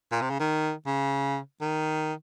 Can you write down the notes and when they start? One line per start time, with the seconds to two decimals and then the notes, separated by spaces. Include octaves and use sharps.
0.11 A#2
0.21 C3
0.30 C#3
0.40 D#3
0.86 C#3
1.61 D#3